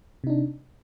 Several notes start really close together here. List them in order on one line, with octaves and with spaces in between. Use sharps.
C3 D#4 D4